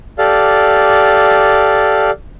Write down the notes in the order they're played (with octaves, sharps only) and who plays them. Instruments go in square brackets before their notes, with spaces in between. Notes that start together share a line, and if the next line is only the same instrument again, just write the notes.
[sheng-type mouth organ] G4 A4 D5 F5